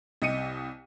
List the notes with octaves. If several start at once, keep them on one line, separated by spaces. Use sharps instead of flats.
C2 D#5 C#7 D#7